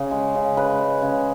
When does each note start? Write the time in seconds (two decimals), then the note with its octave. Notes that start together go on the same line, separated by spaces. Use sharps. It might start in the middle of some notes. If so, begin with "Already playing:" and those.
Already playing: C#3
0.11 G#3
0.35 C#3
0.57 C#3 B4
0.79 G#3
1.02 C#3